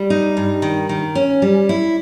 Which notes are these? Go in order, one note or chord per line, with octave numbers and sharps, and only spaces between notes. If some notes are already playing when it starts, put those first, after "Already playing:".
Already playing: G3
D#4
G2
D#3
D#3
C#4
G3
E4